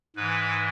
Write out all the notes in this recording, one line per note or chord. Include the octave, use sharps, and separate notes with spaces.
G#2 E3 B4